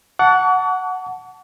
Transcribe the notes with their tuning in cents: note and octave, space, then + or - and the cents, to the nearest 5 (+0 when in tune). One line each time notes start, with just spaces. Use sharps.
F#5 +0 A5 +0 C#6 +45